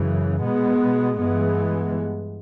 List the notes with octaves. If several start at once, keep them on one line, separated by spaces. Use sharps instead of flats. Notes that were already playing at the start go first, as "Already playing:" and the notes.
Already playing: F#2 C#3 E3
B2 G#3 B3
G2 E3 G#3 B3